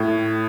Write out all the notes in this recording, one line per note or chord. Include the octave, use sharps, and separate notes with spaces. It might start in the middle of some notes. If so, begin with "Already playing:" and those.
Already playing: A2